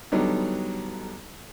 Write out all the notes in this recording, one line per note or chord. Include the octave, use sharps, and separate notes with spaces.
D3 F#3 G3 B3 D#4